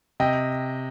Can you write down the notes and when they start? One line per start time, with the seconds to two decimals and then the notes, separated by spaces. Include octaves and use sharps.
0.20 C3 D#5 G5